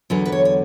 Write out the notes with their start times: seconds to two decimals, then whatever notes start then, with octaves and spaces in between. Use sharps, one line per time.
0.10 E2 D3 F#3 B4
0.26 B4
0.32 C#5
0.45 C#5